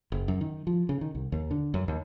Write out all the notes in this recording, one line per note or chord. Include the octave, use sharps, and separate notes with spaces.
F#1
F#2
D#3
F3
C#3
D#3
C2
D#2
D3
F#2
D#2